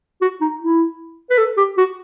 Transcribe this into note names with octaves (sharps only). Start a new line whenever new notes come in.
F#4
D#4
E4
B4
A4
G4
F#4